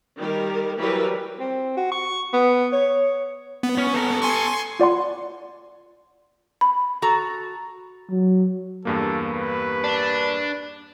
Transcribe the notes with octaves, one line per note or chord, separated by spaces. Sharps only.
D#3 G3 A#4
E3 F#3 G3 A#4 B4
C4
F#4
C#6
B3
C#5
B3
C#4
A4 A#5
G#5 C6 C#6
F4 D5 F#5 C6
B5
F#4 A4 A#5
F#3
E2 G2 A#3 A4
B4
D4